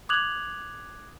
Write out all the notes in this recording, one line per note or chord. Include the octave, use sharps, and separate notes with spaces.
D6 D#6 F#6 G#6 F7 F#7